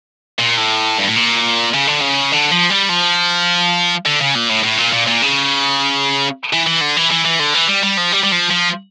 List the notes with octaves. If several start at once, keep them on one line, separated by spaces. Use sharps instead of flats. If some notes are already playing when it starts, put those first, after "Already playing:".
A#2
A2
G2
A2
A#2
C#3
D3
C#3
D3
F3
G3
F3
D3
C#3
A#2
A2
A2
A#2
A#2
A#2
C#3
E3
E3
D3
E3
E3
E3
D3
E3
G3
G3
F3
G3
G3
F3
F3